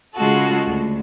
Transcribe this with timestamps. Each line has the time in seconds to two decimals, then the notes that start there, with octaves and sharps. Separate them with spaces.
0.15 C#3 G#3 F4 F#4 A4
0.66 D2